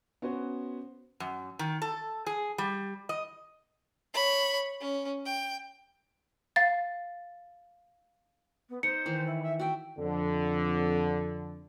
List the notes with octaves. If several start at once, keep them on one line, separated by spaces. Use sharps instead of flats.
B3 C#4 F#4 C5
F#2
D#3
A4
G#4
G3
D#5
C#5 B5
C#4
G5
F5 A6
B3
D#4 C5 C#7
D#3 E3
E4
E5
F#4 E5 G5
F2 D3